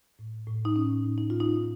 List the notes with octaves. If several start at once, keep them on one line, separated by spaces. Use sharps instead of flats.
A2
A2
D#4
A2 C#4
A2
D#4
A2 F4
D#4